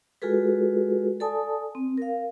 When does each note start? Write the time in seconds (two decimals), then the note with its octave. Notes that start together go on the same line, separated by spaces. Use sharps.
0.22 G#3 F4 F#4 G#4 A4 B4
1.20 A4 D5 G#5 A5 D#6
1.75 C4
1.98 A#4 F5